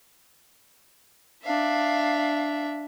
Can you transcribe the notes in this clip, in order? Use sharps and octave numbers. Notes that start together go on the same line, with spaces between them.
D4 E5 F5